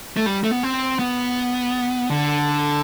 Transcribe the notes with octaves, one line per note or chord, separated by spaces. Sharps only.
A3
G3
A3
B3
C4
B3
D3